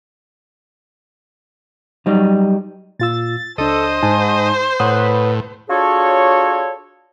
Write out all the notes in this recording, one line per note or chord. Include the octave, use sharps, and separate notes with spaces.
F#3 G3 D#4
A#2 F4 E6 A6
C#2 D4 A4 C5 D#5
G#2 D#4 G#5 A5
A2 B4 C#5 F#5 D#6
D4 F4 F#4 G#4 A4 C#5